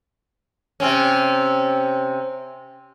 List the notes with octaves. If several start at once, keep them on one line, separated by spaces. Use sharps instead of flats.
C3 C4 C#4